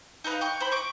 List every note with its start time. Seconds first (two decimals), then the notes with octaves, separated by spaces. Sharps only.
0.24 D#4 A4 B4 F5
0.41 G5 C#6
0.60 C5 B5
0.72 C#6 D6